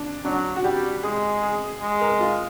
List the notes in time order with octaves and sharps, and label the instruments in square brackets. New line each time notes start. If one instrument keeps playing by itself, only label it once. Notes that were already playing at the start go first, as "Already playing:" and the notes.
Already playing: [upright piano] D4
[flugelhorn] F#3 [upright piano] D4
[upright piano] F#4
[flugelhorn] G3 [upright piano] G4
[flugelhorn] G#3 [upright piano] G#4
[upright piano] G#4
[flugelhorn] G#3
[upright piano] A#4
F4